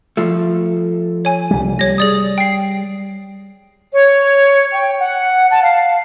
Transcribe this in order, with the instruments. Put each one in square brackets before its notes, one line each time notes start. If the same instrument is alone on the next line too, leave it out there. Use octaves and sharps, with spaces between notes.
[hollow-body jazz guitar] F3 A3
[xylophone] C#5 G#5
[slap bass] C2 G3
[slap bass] G3 [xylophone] C#5 A#6
[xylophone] G#4 D5 D#6
G5 C7
[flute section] C#5
G5
F#5
A5
F5